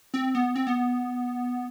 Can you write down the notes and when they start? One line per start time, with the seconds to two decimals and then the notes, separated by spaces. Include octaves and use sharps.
0.14 C4
0.35 B3
0.56 C4
0.67 B3